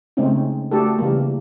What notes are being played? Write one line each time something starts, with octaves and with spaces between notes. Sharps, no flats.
C#3 G#3 A3 C4 C#4 D#4
A3 D4 F#4 G4 A4
C#3 E3 G3 A#3